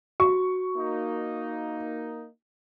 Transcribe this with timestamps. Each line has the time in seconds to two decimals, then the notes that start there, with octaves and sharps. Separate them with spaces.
0.20 F#4 C#6
0.76 A#3 D#4